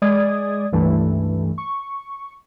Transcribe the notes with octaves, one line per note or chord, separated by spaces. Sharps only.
G#3 D5 D#6 G#6
C#2 G2 E3 A3
C#6